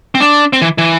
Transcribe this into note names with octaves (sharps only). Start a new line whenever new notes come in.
C4
D4
C4
E3
E3